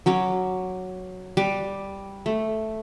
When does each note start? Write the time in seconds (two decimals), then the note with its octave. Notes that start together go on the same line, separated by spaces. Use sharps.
0.06 F#3 C#4 D6
1.37 G3 D6
2.26 A3